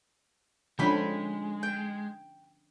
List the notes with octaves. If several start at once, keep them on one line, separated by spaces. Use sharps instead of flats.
D3 F3 G#3 C#4 G5 B5 C#6
G5